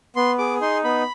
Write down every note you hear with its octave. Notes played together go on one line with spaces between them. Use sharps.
B3 C6
G#4 D6
D#4 C6
B3 B5